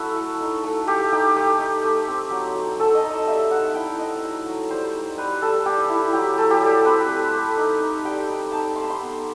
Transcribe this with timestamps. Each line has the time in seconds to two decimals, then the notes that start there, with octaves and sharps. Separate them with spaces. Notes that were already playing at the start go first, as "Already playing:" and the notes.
Already playing: F#3 E4 F#4 A4
0.16 A3
0.40 D#4
0.63 A3
0.87 A3 G4
1.12 D#4 G4
1.36 A3 G4
1.59 D#4
1.84 A3
2.08 C4
2.31 F#3
2.55 F#3
2.80 A3 A4
2.95 D#5
3.03 D#4
3.10 D#5
3.26 G3 E5
3.50 D#4 F#5
3.74 E4 G5
3.98 C4 D#5
4.23 F#3
4.46 F#3
4.70 G3 C5
4.94 D#4
5.17 G3 B4
5.42 G3 A4
5.65 G3 G4
5.89 E4
6.13 F#3 G4
6.38 F#3 A4
6.50 G4
6.61 G3 A4
6.85 C4 B4
7.09 A3
7.34 A3
7.57 D#4
7.80 D#4
8.05 G3 G5
8.28 D#4
8.52 D#4 A5
8.76 A3 C6
8.84 B5
8.90 C6
9.00 B3 B5